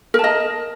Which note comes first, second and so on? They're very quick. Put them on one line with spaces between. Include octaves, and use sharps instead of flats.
A#4 A5 D#5